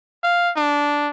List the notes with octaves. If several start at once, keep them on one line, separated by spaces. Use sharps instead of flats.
F5
D4